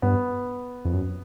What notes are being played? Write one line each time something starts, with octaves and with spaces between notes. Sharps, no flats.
G2 B3
F2
F#2